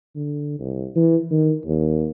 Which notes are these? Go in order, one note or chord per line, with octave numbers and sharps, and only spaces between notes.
D3
C2
E3
D#3
D#2